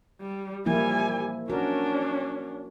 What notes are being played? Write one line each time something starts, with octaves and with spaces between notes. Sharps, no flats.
G3
F3 G3 A#3 E4 G#5
C#4 D4 F#4 A#4